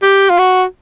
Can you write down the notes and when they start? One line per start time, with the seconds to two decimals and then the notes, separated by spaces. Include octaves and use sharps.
0.03 G4
0.30 F4
0.39 F#4